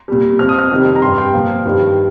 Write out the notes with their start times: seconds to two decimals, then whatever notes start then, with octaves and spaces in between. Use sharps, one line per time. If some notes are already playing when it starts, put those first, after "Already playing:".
0.08 A#2 G3
0.39 F2 F3 F6
0.49 D#6
0.59 F6
0.71 F2 C3 D#3 G3
0.96 A#5
1.02 G2 G3 C6
1.18 G5
1.34 A#2 F3 F5
1.65 G2 D#3 G3